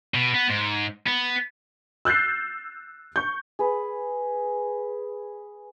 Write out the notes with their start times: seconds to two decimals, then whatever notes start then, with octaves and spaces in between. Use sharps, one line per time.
0.14 B2
0.35 B3
0.50 G#2
1.07 B3
2.05 E6 F#6 G6 A6 C7
3.16 C#6 G6
3.59 G#4 B4